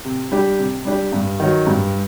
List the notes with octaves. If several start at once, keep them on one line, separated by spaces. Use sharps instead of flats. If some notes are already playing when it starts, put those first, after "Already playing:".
C3
G3 D4 G4
C3
G3 D4 G4
G2
D#3 F#3
G2